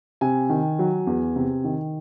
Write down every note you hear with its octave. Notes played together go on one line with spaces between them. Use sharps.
C3 G#5
D#3
F#3
E2
C3
D#3